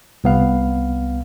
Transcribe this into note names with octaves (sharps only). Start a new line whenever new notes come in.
C2 B3 F5